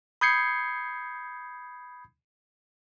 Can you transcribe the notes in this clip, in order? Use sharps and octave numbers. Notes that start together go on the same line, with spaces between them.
B5 D#6 G6 G#6 C7 C#7